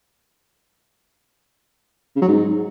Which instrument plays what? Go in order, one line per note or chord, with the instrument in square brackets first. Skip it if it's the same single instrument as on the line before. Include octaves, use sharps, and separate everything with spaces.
[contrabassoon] C#3
F#3
G#2